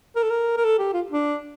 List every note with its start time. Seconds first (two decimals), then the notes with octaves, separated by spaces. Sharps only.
0.16 A#4
0.23 A4
0.30 A#4
0.57 A#4
0.65 A4
0.79 G4
0.93 F4
1.12 D4